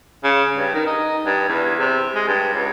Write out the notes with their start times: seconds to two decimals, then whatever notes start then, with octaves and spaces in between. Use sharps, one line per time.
0.24 C#3
0.56 G2
0.74 D#3
0.86 D#4
1.26 G2
1.49 E2
1.79 C3
2.15 G#3
2.27 G2
2.53 C#2